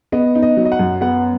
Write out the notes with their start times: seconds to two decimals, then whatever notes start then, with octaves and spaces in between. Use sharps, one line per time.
0.12 B3 D#5
0.35 D#4
0.43 D#5
0.57 F#3
0.65 D#5
0.72 F#5
0.79 F#2
1.01 B3 F#5